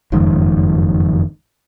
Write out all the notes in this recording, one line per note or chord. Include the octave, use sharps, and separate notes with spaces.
F#1 F2 G#2 D#3